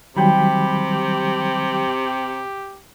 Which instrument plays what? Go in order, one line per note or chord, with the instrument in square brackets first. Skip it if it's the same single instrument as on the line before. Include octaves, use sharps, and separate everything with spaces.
[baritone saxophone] C3 [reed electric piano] D#3 F#3 G3 [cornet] G4 [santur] G5 B5